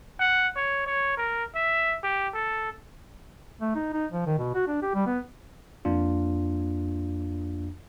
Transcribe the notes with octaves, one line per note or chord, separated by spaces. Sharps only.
F#5
C#5
C#5
A#4
E5
G4
A4
A3
D#4
D#4
F3
D#3
B2
F#4
D4
G4
G3
B3
F2 A#3 D4 F4